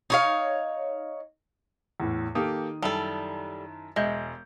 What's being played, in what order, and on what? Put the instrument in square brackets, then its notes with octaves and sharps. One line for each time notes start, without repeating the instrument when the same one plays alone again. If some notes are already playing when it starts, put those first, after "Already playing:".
[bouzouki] D#4 C#5 F5
[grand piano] E2 A2
[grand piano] D#3 D#6 [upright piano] A#3 G4 A4
[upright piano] F#2 E4 A5 [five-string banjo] G3 A4
[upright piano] E1 G6 [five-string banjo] G#3 [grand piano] D#5 E5